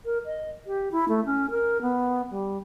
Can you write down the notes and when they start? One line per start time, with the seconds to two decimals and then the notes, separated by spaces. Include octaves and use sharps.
0.05 A#4
0.25 D#5
0.67 G4
0.92 E4
1.09 A3
1.25 C#4
1.51 A#4
1.82 B3
2.31 G3